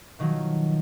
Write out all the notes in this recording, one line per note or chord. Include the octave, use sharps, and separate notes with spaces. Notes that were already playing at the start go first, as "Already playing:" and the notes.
B2 D#3 F3 F#3